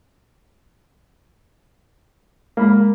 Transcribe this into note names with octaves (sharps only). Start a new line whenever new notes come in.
G#3 A#3 B5